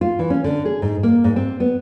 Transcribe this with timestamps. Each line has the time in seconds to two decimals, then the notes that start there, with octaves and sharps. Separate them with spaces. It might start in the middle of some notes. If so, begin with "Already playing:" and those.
0.01 F4
0.19 E3
0.30 C#4
0.44 D3
0.65 G#4
0.82 G#2
1.03 A#3
1.24 G#2
1.36 C4
1.60 B3